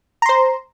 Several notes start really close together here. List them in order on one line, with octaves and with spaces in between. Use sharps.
A#5 C6 C5